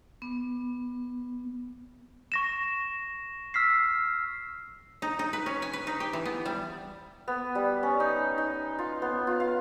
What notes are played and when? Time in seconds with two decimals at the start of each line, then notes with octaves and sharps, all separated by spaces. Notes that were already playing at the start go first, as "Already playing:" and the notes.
0.22 B3
2.32 C#6 A#6 E7
3.54 E6 F6 B6 C7
5.02 D#4
5.19 D#4
5.33 B4
5.46 C#4
5.62 G#5
5.73 B4
5.87 D#4
6.00 G4
6.13 E3
6.25 B3
6.46 G3
7.28 B3
7.55 G3
7.83 C#4
8.00 D#4
8.38 D#4
8.79 F4
9.02 B3
9.27 F4
9.40 F5